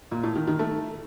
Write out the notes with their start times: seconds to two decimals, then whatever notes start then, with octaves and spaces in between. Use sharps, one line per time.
0.11 A#2
0.23 A2
0.35 D#3
0.47 D#3
0.59 A3